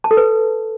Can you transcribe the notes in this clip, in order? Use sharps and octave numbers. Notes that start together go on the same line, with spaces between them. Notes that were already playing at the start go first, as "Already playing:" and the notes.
A5
A4
B4